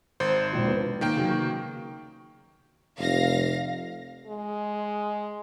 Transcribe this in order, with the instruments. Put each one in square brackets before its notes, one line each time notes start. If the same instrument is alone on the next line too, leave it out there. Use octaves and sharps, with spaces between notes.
[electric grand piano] G#1 C5
[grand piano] E1 A#1
B3
[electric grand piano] D#3 A#3 G5
[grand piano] C#3 F#3
C#6
[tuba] F1 [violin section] F5 A#6
[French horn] G#3